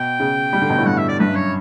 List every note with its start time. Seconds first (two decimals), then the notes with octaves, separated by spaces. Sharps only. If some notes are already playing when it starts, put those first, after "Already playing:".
Already playing: B2 G5
0.20 C#3
0.53 G3
0.62 D3
0.70 B2
0.78 A2
0.86 G2 F#5
0.97 E5
1.09 D5
1.19 G2 B4
1.28 F#2
1.35 C#5